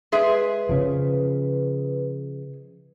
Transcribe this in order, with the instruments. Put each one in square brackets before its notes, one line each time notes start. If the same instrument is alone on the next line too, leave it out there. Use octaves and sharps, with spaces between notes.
[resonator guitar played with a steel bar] G#3 G#4 E5 [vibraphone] B4
[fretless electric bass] C#3 F3